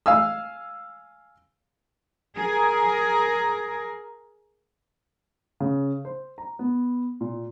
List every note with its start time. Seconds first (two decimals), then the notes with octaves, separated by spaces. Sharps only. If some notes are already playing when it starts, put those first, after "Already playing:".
0.06 F5 G#5 E6
2.36 G#4 A#4
5.60 C#3
6.05 C5
6.38 A#5
6.59 B3
7.21 A#2